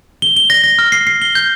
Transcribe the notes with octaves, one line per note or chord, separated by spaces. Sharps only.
G7
G7
A#6
A#6
F6
C7
C7
G7
G6